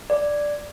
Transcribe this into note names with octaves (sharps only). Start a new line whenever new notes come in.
D5